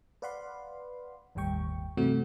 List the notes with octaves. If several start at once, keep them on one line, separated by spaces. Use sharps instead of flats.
B4 D5 F5 F#5 B5 C6
G1 D#2 A2 G3 G5 C#6
G2 C3 E3 A3 C4 F#4